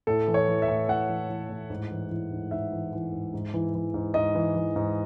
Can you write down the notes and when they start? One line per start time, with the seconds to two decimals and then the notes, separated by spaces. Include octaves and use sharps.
0.07 A2 A4
0.28 E3
0.34 C#5
0.48 E3
0.62 E5
0.68 A2
0.88 A2 F#5
1.09 E3
1.29 E3
1.49 A2
1.70 G#2
1.91 E3
2.11 E3
2.32 G#2
2.51 G#2 E5
2.72 E3
2.93 E3
3.13 G#2
3.34 G#2
3.54 E3
3.75 E3
3.94 G#2
4.14 G#2 D#5
4.35 E3
4.56 E3
4.76 G#2